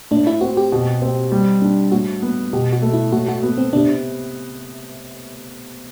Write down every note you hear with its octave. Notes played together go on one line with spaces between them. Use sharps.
A2 D4
E4
C4 F#4
G4
B2
C4
G3
D4
A2 F#4
B3
B2 G4
F#4
A3
E4
A2 F#4
F#4
B3
C4
C3 D4